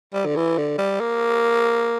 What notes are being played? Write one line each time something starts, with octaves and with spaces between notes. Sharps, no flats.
G3
D3
E3
D3
G3
A#3